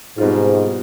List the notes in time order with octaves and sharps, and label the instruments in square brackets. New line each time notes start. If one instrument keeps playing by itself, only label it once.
[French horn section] G#2 [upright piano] B2 G3 C4 F4